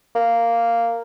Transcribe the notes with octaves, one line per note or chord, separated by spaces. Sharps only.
A#3